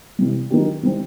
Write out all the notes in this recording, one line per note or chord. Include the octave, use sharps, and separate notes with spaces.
C3 E3 G3
D#3 F#3 A#3 D4 G4
D#3 G3 C4